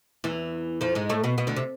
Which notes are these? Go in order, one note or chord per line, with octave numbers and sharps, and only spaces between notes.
E2 E3
F2 F3
G#2 G#3
A2 A3
B2 B3
B2 B3
D2 D3
C3